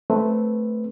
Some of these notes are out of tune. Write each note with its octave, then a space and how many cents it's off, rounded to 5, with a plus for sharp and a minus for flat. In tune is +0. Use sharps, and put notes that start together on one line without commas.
A3 +0 C4 +0 B4 -10